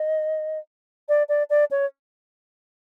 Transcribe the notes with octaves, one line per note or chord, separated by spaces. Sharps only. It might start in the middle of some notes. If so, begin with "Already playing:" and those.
Already playing: D#5
D5
D5
D5
C#5